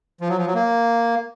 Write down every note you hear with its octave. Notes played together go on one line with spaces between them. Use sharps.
F3
F#3
F3
F#3
A#3